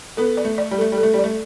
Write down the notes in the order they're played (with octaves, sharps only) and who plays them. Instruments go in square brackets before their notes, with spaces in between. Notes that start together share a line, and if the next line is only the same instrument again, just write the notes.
[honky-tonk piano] B3 [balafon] A4
[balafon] D5
[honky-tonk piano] A3
[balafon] D5
[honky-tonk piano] G3
[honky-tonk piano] A3 [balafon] A4
[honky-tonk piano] G3
[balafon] A4
[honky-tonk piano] A3
[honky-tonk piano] G3 [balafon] D5
[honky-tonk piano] A3